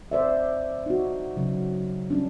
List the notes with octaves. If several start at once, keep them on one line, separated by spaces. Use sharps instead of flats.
C5 D5 E5
D#4 F#4
C#3 F#3
G3 C#4 D4